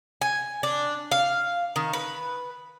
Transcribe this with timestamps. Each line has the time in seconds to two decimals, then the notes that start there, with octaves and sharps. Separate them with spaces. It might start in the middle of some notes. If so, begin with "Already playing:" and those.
0.22 G#5
0.63 D4
1.12 F5
1.76 D#3
1.93 B4